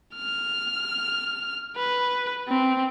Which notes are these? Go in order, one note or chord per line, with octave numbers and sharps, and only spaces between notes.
F6
B4
C4